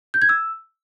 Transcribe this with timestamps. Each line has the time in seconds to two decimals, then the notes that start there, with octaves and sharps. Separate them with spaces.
0.14 G6
0.22 G#6
0.29 E6